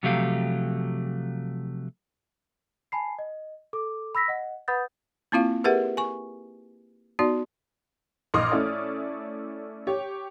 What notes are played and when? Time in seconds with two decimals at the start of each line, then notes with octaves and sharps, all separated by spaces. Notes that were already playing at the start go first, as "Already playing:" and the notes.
0.03 C3 F3 F#3 A3 G4 F5
2.92 G#5 A5 B5 C7
3.19 D#5
3.73 A4 D6
4.15 B5 E6 A#6 B6
4.28 D#5 F#5
4.68 B4 F#5 B5 D#6 G6 A6
5.32 A#3 C4 E4 F4 F5
5.64 G4 G#4 A#4 B4 E5 F#5
5.97 G#5 C#6
7.19 B3 D#4 F#4 D5
8.34 A#1 D#5 C6 D6 D#6 F6
8.52 A3 C#4 E4 A4 D5
9.87 G4 C#5